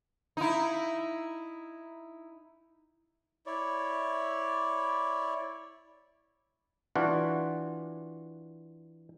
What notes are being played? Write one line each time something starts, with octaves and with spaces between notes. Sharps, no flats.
D#4 E4
E4 C#5 D5
E3 D4 F4 F#4